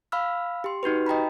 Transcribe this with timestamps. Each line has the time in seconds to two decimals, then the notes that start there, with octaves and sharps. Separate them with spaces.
0.12 F5 B5 E6 F6
0.64 G4 C6
0.83 D#4 F#4 G4 B4
1.06 D#5 G5 A#5 B5